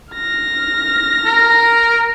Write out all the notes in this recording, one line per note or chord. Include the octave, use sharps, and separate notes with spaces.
F6 A#6
A#4